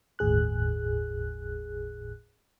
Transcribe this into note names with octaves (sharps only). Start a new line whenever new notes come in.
G1 D#2 A2 G#4 F#6